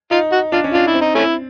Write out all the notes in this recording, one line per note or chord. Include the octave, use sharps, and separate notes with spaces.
D#4 F4
F#4
D4 F4
C#4
D4 F4
E4
C4
D#4
A3 C#4 E4